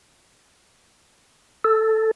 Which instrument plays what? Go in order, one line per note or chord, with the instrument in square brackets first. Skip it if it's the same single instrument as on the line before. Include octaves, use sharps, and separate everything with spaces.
[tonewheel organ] A4